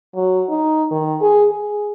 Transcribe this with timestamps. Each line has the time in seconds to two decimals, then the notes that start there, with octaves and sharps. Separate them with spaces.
0.16 F#3
0.49 D#4
0.91 D#3
1.21 G#4
1.52 G#4